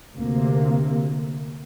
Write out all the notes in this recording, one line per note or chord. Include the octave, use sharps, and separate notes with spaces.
D2 C3 A#3